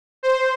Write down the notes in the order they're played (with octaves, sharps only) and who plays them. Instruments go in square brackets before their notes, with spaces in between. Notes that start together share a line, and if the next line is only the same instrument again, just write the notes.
[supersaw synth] C5